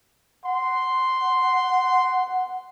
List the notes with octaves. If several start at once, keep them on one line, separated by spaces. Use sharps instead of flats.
F#5 C6